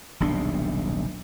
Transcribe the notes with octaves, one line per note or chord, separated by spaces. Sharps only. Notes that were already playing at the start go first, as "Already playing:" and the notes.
D#1 B1 C3 D4